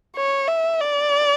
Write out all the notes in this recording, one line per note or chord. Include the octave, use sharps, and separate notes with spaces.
C#5
E5
D5